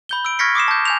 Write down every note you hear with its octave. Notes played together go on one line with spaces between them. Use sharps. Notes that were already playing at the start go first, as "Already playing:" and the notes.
B5 G6 G7
E6 D7
C#6 F6 G#6 A#6 B6 C#7
D6 D#6 C7 E7
A5 G6
G#5 G6 F7